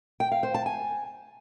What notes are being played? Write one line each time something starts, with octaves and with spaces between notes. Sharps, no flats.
G5
F5
C5
A5
G#5